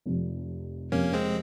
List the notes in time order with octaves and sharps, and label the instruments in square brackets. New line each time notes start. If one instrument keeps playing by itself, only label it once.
[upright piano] F1 F2 C3
[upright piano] F1 F2 C3 [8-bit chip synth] A#3 C#4
[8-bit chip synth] G#3 C4